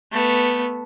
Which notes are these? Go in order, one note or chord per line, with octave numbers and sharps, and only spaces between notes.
A3 B3